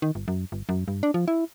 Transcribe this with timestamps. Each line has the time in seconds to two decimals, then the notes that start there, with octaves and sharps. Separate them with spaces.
0.02 D#3
0.15 G1
0.28 F#2
0.52 G1
0.69 F#2
0.88 G2
1.03 D4
1.14 F3
1.28 E4